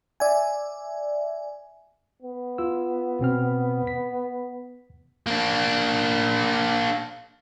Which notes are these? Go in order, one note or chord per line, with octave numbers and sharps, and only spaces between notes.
D5 E5 G#5
B3
F4 E6
B2 C4 F6
B6
A#3 D4